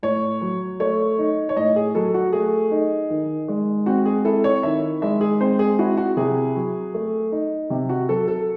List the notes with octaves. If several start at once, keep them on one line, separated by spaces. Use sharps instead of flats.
A2 C#5
F#3
A3 C#5
D#4
C#5
A2 D#5
G#4
F#3 A4
F#4
A3 G#4
D#4
D#3
G#3
C4 F#4
G#4
E4 A4
C#5
D#3 E5
G#3 E5
G#4
C4 C5
G#4
E4 F#4
F#4
C3 G#4
F#3
A3
D#4
C3
F#4
F#3 A4
A4